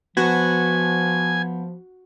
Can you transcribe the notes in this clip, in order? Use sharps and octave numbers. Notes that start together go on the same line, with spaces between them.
F3 B3 F#4 G#5